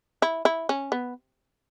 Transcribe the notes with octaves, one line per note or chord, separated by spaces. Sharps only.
E4
E4
C#4
B3